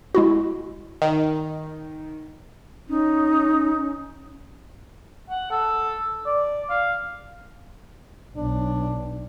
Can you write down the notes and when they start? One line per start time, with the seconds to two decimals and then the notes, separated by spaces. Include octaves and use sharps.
0.15 G#3 E4 F#4
1.02 D#3
2.89 C#4 D#4
5.30 F#5
5.51 A4
6.26 D5
6.70 F5
8.37 B1 D4